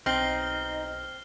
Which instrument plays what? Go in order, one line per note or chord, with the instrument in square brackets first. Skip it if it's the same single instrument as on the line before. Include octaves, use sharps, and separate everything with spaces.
[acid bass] B1 [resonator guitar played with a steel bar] C4 [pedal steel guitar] D#4 [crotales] F6 C7 G7